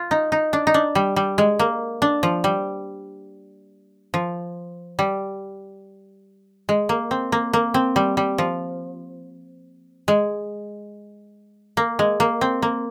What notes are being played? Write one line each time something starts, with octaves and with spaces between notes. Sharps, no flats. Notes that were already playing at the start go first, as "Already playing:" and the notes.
Already playing: F4
D#4
D#4
D4
D#4
D4
G3
G3
G#3
A#3
D4
F3
G3
F3
G3
G#3
A#3
C4
A#3
A#3
C4
G3
G3
F3
G#3
A#3
G#3
A#3
C4
A#3